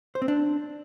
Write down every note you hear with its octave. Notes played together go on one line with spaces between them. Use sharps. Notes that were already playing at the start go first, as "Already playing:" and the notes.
C5
C4
D4